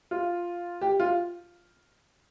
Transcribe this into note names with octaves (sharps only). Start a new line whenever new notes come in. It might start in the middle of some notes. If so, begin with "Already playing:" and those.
F4
G4
F4